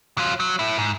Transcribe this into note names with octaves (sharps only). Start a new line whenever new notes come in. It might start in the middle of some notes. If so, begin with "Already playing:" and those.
F#3 F4
F#3
A3 E4
G#2